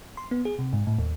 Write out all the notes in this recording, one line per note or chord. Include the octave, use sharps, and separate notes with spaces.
C6
B3
G#4
C3
G#2
A2
D#2